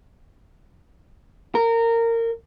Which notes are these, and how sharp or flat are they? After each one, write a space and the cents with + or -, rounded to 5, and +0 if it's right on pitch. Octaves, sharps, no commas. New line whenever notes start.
A#4 -20